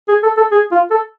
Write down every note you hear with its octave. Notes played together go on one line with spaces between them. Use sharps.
G#4
A4
A4
G#4
F4
A4